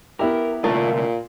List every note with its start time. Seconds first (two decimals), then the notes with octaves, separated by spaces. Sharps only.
0.19 B3 E4 G4 A#4
0.64 C2 A#2 D3 A3 F4 A#4
0.93 A#2